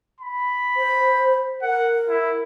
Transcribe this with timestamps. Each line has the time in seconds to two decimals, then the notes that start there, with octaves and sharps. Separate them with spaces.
0.20 B5
0.77 C5
1.62 A#4 F#5
2.09 E4